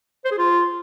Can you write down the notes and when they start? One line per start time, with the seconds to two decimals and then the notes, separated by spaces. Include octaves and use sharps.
0.25 C5
0.31 G#4
0.38 F4